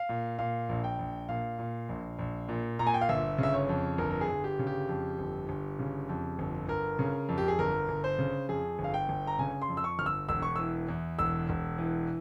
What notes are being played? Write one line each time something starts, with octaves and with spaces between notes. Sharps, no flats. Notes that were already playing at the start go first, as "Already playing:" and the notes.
Already playing: F5
A#2
A#2 F5
A#1
G5
A#1
A#2 F5
A#2
A#1
A#1
A#2
A#2 A#5
G#5
G5
F5
G1 E5
C#3 E5
C#5
F2
G1 A#4
A#4
G#4
G1
G4
C#3
G4
F2
G1
G1
C#3
F2
G1
G1 A#4
C#3
F2
G4
G#4
G1 A#4
G1
C5
C#3
F2 G#4
G1
F5
G5
G1
A#5
C#3 G#5
C6
F2
E6
C#6
G1 F6
E6
E1 E6
C#6
E3 E6
E2
E1 E6
E1
E3